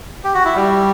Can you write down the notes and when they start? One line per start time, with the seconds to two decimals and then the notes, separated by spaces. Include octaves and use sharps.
0.24 G4
0.34 F#4
0.45 E4
0.55 G3